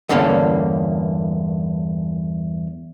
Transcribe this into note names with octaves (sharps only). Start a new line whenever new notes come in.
E2 G2 D3 A#3 C#4